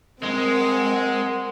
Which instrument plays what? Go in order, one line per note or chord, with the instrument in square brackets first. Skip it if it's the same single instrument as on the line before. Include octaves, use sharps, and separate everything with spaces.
[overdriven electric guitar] G#3 [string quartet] C4 A#4 F#5